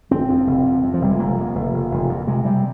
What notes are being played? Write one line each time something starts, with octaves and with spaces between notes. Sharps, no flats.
F1 C4
F2
F1
F2
F2
F3
F1 G3
G#3
F1 A#3
F2
F1
F1
F1
F2
C3 G#3
C3 G3